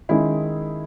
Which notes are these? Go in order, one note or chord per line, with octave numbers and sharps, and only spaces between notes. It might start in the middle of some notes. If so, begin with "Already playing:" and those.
D#3 G#3 C#4 E4